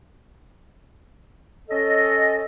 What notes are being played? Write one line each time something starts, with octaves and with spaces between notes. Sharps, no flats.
C#4 A4 D#5